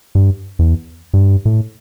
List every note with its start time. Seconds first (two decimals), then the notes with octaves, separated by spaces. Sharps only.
0.15 G2
0.59 E2
1.14 G2
1.45 A2